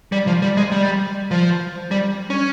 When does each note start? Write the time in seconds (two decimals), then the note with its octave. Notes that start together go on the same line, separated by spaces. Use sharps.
0.12 G3
0.27 F3
0.42 G3
0.57 G#3
0.72 G3
1.31 F3
1.91 G3
2.30 C#4